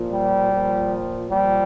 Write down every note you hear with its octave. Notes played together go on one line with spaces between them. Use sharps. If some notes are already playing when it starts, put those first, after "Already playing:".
Already playing: A#2 F3
G3
A#2 F3
A#2 F3 G3